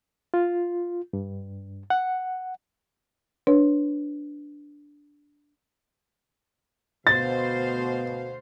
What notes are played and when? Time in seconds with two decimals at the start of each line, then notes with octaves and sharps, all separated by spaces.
0.34 F4
1.13 G2
1.90 F#5
3.47 D4 B4 C#5
7.07 D2 B2 C5 F5 A6